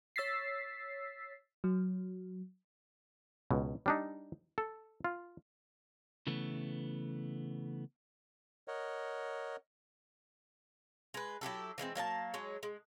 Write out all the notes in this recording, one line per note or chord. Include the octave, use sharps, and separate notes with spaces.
C#5 E6 A6 B6 C7
F#3
C#2 B2
G3 D4 D#4
A4
F4
C#3 E3 A3 B3
A#4 C#5 D#5 F#5
G#3 B4
F#3 E4 G4 A4
E3 G#3 A#3 C4
F#3 A#3 D5 A5
F#3 G#3 C#5
G#3